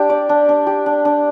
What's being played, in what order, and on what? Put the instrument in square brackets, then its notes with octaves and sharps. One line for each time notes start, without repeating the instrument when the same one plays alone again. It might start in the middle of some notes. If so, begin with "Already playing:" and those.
Already playing: [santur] D4 G4
D5
D4
D4
G4
D4
D4